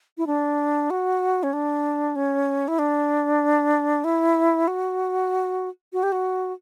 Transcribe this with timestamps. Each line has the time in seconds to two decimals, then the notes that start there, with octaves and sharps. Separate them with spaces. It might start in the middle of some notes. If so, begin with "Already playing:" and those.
0.18 E4
0.27 D4
0.90 F#4
1.43 C#4
1.53 D4
2.16 C#4
2.68 E4
2.79 D4
4.04 E4
4.67 F#4
5.93 F#4
6.03 G4
6.12 F#4